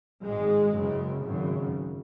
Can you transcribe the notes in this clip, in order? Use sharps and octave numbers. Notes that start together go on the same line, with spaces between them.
G#1 G#2 G#3
F#1 F#2 C#3
G#1 F#2 C#3